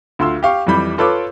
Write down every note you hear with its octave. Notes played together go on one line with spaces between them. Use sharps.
D2 F4 C6 E6
G4 F5 C#6
F2 E3 G3 B5 G6
F4 A4 B4 C#5 D6